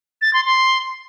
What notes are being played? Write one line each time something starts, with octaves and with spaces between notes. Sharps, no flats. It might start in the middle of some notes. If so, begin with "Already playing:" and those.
A6
C6
C6